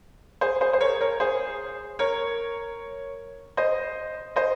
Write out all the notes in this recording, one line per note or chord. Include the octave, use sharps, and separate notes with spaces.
G#4 C5
G#4 C5
C5
A#4 C#5
A#4 C#5
G#4 C5
A#4 C#5
C5 D#5
C5 D#5